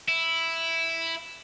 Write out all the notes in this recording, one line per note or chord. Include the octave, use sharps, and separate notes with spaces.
E4